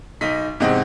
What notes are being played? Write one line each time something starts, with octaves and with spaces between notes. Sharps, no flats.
B1 D#4 B6
E2 G#2 C3 C4 D#5 F#5